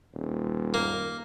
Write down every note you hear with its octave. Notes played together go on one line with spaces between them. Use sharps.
D#1
A#3